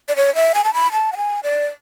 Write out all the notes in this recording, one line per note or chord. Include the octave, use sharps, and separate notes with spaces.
D5
C#5
E5
G#5
A5
B5
A5
F#5
G#5
D5